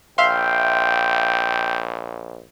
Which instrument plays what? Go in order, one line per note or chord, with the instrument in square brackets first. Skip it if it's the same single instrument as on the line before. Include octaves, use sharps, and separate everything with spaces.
[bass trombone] A#1 [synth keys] E5 F5 C6 [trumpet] G5